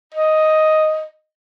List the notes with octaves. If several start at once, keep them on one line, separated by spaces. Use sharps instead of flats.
D#5